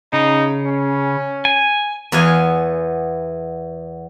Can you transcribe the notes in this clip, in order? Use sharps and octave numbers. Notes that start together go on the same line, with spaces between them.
C#3 D#4
C#4
G#5
E2 B3 B4 F5 G#5